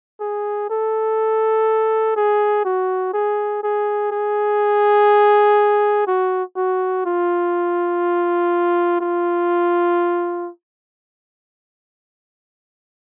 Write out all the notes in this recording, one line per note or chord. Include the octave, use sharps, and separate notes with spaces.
G#4
A4
G#4
F#4
G#4
G#4
G#4
F#4
F#4
F4
F4